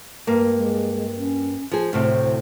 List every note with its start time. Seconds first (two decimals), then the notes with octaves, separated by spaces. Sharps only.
0.27 G2 A#3
0.54 G#3
1.17 C#4
1.72 F3 G#4
1.93 D2 A2 C3 C5